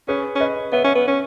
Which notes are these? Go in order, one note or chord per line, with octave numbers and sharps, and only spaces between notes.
C#4 G#4 B4
C#4 B4 D#5
B3 C#5 E5
C#4
B3
C#4